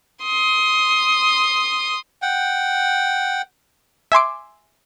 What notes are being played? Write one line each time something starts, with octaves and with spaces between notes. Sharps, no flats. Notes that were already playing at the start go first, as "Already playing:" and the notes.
C6 D#6
F#5 G5
E5 G#5 C6 D6